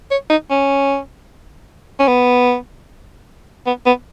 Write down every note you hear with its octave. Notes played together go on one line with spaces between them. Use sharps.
C#5
D#4
C#4
C#4
B3
B3
B3